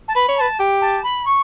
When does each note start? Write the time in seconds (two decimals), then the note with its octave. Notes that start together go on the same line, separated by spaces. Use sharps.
0.08 A5
0.15 B4 B5
0.28 C#5
0.38 B4 A5
0.59 G4
0.81 A5
1.03 B5
1.25 C#6